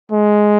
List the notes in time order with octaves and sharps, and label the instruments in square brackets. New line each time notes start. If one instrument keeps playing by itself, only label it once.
[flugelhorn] G#3